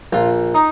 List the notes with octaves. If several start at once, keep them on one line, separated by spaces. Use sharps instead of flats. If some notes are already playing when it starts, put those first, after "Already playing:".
A#1 F4
D#4